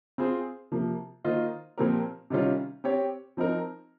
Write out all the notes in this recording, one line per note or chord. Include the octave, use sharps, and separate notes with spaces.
C4 F4 G#4 C5
C3 F3 A#3
D#3 A#3 F4 C5 D#5
A#2 F3 C4 G4 A#4
C3 D#3 G3 C#4 F4
C4 G4 C#5
F3 C4 D#4 A#4